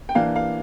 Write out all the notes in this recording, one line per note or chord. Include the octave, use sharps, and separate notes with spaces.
G5
E3 A#3 D4 F5
F5